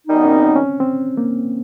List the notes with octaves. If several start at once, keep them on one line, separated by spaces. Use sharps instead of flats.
F#2 D#3 G3 B3 D#4
C#4
C4
C#4
C4
A#3